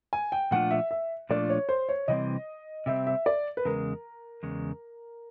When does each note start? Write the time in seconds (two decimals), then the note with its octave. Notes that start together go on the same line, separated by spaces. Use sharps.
0.13 G#5
0.32 G5
0.51 A#2 F3 A3 D4 F4 F#5
0.71 E5
0.91 E5
1.29 A#2 F3 A3 D4 F4 D5
1.50 C#5
1.69 C5
1.89 C#5
2.08 C3 E3 G3 C4 D#5
2.86 C3 E3 G3 C4 E5
3.07 E5
3.26 D5
3.57 B4
3.65 E2 C#3 G#3 A#4
4.43 E2 C#3 G#3